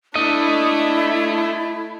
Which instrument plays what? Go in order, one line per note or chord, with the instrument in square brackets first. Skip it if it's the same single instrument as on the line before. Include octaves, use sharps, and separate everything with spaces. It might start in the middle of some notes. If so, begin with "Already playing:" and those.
[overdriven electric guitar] A3 [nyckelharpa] D4 [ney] E4 [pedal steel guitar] D#5